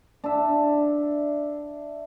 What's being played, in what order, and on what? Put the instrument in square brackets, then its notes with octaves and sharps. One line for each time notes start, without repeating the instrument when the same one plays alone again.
[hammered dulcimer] D4 E5